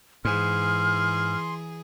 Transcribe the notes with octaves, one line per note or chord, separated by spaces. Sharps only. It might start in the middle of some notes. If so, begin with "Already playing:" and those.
G#2 E3 G#4 C6 F6